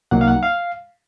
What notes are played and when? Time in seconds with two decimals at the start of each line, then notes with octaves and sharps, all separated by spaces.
0.11 C2 C3 F#3 A#3 D#4 F#5
0.21 F5
0.28 F#5
0.43 F5